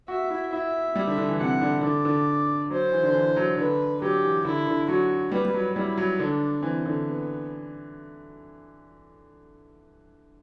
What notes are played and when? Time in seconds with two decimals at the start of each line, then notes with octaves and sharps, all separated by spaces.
0.08 F#4 E5
0.30 E4
0.52 E4 E5
0.96 G3
1.07 D3
1.18 D3
1.29 E3
1.40 C3 F#5
1.61 D3
1.83 D3 D5
2.05 D3
2.70 F#3 C5
2.92 E3
3.03 D3
3.14 E3
3.36 F#3
3.57 D3 B4
4.02 F#3 G4
4.23 E3
4.45 D3 E4
4.67 D3
4.88 F#3 F#4
5.32 G3 B4
5.45 G3
5.54 F#3
5.75 G3 E4
5.98 F#3
6.19 D3 D4
6.62 E3 C4
6.85 D3
7.07 B3